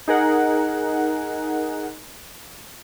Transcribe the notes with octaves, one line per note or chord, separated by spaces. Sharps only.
D#4 G#4 A#4 F#5